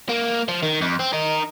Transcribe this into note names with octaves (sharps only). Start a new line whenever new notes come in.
A#3
F3
D#3
F2
C4
D#4 A#4